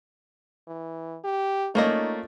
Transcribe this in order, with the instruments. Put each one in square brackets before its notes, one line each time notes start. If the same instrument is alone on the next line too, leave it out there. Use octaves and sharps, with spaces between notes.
[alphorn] E3
G4
[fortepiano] A3 A#3 C#4 [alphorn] D#4 [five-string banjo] F4 D5 D#5